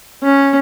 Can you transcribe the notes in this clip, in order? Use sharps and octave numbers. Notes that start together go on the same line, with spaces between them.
C#4